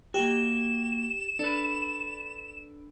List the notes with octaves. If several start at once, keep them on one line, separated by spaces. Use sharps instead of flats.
A#3 F#4 G4 E7
D4 A4 B4